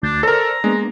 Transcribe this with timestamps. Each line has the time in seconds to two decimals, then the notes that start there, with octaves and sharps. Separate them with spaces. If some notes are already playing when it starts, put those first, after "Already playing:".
0.03 D2 D4 G6 A6
0.23 A4 A#4 C5 D5 A#5
0.64 G#3 A#3 B3 D4